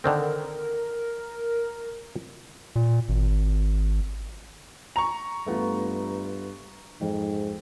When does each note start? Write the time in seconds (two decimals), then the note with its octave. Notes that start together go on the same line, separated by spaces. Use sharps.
0.04 D3 D#3 C4 A#4
2.76 A#2
3.09 G#1
4.96 A#5 C#6 F7
5.47 G2 A3 B3 F4
7.01 F2 G#2